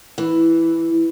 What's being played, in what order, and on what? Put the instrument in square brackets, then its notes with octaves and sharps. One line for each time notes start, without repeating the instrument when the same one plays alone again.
[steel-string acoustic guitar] E3